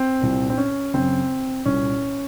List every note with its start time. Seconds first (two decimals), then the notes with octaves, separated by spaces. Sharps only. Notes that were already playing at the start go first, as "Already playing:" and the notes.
Already playing: C4
0.21 C2 A#2
0.50 C4
0.58 C#4
0.94 F#2 C#3 C4
1.65 C2 A#2 C#4